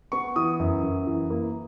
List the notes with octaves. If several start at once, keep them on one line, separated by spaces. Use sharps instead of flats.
B3 C#6
E3 D#6
F#2
F#2
E3
A#3